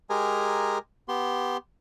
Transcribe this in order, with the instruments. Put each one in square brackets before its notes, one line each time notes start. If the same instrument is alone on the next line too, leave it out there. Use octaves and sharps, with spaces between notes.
[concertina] G#3 G4 G#4 A#4 G#5 A#5
B3 G4 C6